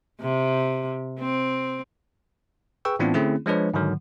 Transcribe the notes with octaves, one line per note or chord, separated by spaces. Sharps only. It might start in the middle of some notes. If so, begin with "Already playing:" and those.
C3
C4
G#4 B4 G5 C#6 E6
A2 E3 B3 C4 D4 F4
D3 A3 C4 C#4 E4 G#4
F3 G#3 D4 B4 C#5
G#2 D3 D#3 F#3